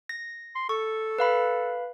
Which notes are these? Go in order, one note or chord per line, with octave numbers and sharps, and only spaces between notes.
A#6
C6
A4 C#6
B4 F5 B5